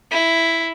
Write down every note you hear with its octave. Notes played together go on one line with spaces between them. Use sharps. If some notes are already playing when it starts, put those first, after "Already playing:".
E4